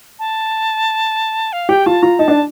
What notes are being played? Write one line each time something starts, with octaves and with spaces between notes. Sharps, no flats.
A5
F5
G4 G5
F4 A5
F4 A#5
D#4 A5
D4